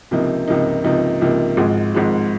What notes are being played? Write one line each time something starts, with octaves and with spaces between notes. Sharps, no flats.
C#2 C3 F3 A#3 D#4
C#2 C3 F3 A#3 D#4
C#2 C3 F3 A#3 D#4
C#2 C3 F3 A#3 D#4
G#1 G#2 F3 G#3
G#1 G#2 F3 G#3